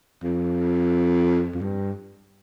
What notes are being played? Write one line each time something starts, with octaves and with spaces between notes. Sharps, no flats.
F2
F2
G2